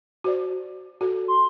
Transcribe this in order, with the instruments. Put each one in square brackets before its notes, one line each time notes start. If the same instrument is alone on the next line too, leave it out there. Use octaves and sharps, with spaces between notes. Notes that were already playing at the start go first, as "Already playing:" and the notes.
[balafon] F#4 C5 D5
F#4 A4
[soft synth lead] C6